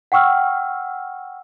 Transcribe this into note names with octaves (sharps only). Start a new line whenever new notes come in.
F#5 G5 C#6 E6 F6